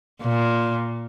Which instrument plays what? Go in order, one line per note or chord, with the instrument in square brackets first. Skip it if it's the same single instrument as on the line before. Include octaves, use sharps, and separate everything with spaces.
[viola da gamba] A#2